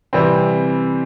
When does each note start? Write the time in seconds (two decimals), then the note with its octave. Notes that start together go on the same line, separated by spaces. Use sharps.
0.13 C3 E3 G3 C4